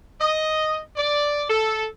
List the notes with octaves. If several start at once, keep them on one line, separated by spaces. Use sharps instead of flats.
D#5
D5
A4